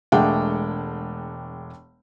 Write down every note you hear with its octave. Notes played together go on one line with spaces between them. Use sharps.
E1 G#3 A3 D4 F#5 G5